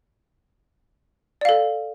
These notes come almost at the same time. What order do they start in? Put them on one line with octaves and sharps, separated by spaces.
D5 F5 A4